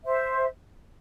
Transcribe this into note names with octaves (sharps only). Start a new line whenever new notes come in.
C5 E5